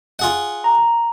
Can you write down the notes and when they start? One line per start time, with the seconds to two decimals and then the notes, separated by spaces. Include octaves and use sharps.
0.19 F4 G#4 F#5
0.64 A#5